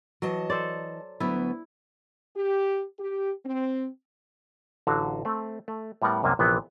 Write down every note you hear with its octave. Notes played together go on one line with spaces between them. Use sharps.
E3 F#3 D#5 A5
A4 C5 D5
D2 F#3 B3 E4
G4
G4
C4
A1 D3 F#3 F#4 F5
A3 C4
A3
A2 G3 B3 A#4 F#5
C2 F#2 C3 A#3 G#5 A5
A#1 C3 E3 B3